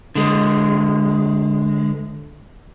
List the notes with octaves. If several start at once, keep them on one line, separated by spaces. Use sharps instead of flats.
D3 G#3